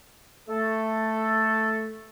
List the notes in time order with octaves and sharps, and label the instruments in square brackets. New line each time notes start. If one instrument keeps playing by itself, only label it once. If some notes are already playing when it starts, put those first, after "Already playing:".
[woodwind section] A3 A4